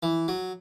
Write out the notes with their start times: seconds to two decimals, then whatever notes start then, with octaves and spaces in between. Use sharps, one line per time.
0.03 E3
0.28 F#3